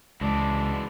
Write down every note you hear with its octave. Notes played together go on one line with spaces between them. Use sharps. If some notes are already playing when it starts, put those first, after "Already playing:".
C#2 E3 G#3 D5 A5